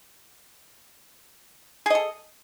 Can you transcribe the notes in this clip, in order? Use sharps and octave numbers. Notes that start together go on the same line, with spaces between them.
G#4 A4 D#5